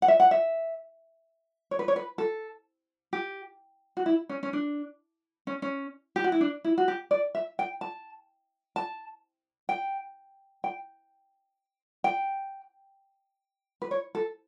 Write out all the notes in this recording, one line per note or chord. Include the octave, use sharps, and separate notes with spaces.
F#5
E5
F#5
E5
C#5
B4
C#5
B4
A4
G4
F#4
E4
C#4
C#4
D4
C#4
C#4
G4
F#4
E4
D4
E4
F#4
G4
D5
E5
G5
A5
A5
G5
G5
G5
B4
C#5
A4